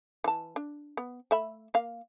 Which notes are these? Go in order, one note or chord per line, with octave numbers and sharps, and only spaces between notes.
E3 A5
D4
B3
A3 E5 B5
A#3 F5